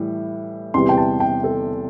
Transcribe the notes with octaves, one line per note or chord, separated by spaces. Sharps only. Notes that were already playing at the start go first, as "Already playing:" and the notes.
Already playing: A2 E3 G3
E2 C3 E3 G3 C6
G5
A5
G5
A4